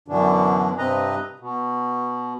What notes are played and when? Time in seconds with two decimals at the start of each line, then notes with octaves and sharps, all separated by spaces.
0.08 F#2 B2 D3 E3 D4
0.78 G2 C3 C4 B4 D#5 A#5
1.40 B2